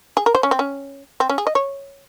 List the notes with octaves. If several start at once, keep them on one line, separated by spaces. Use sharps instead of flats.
G#4
A#4
C5
C#4
C4
C#4
C4
C#4
G#4
D#5
C#5